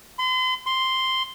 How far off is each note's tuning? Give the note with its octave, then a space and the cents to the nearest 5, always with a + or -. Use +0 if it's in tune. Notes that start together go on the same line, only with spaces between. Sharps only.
C6 -40
C6 +0